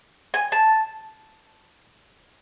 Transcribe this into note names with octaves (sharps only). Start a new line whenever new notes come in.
G#5
A5